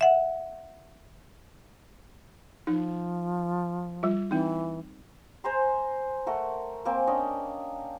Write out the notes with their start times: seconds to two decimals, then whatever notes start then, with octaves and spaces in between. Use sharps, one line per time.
0.01 E5 F#5
2.67 F3 D#4
4.03 G3 F4
4.31 E3 C4 D#4
5.44 C5 G#5 A#5 C6
6.26 A3 A#4 F#5
6.85 A#3 C4 G#5
7.07 C#4 D4 D#5 G5